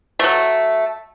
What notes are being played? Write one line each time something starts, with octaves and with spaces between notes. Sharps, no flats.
F#3 A3